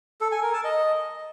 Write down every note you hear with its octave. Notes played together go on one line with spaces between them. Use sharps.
A4
G#5
A#4
A5
D#5